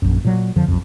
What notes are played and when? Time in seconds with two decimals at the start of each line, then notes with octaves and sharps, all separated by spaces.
0.02 A#1 F#2
0.25 A#2 F#3
0.56 F2 D3 F3
0.68 B1 F2